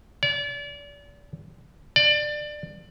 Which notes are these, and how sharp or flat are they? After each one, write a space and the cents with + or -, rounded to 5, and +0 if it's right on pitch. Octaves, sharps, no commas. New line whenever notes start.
D5 -35
D5 +20